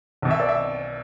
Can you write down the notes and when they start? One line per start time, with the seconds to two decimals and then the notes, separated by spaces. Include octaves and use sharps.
0.22 B1 B2
0.31 E5
0.40 D5
0.49 E5